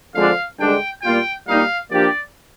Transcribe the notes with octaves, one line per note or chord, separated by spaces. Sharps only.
F2 D3 F3 G#3 D4 F5
G2 D3 G#3 D4 G5
A#2 G3 A#3 F4 G5
A#2 G3 A#3 D#4 F5
F3 A#3 D4 G4 D5